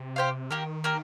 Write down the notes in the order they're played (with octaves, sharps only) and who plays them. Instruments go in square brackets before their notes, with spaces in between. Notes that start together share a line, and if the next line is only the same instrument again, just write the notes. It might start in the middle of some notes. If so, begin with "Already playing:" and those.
Already playing: [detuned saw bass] C3
[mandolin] G4 C5 F5
[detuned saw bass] D#3 [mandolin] A#3 G4 A#4
[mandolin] A#3 G4 A#4